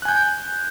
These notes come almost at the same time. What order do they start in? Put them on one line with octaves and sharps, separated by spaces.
F#6 G#5 G6